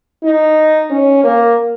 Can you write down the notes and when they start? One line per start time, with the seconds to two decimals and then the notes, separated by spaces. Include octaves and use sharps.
0.23 D#4
0.90 C#4
1.24 A#3